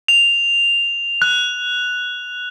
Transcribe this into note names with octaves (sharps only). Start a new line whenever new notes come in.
F7
F#6